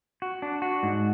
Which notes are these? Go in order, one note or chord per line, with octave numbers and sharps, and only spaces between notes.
F#4
D4
F#4
G#2